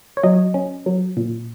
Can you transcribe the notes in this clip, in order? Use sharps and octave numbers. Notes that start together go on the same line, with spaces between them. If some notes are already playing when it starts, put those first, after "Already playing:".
C#5
F#3 D#5
C#4
F#3
A#2